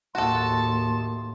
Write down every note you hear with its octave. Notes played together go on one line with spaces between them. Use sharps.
D#2 A2 F#4 A4 A5 C6